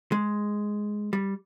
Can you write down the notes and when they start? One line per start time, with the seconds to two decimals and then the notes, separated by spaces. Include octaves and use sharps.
0.12 G#3
1.13 G3